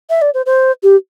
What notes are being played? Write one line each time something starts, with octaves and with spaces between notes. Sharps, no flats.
E5
D5
C5
C5
G4